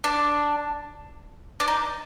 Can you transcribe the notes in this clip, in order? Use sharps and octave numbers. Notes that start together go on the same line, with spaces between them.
D4
D4
D#4